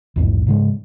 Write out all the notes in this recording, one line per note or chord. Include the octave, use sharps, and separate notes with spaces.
A#1 E2 G#2
G#2 C#3 G#3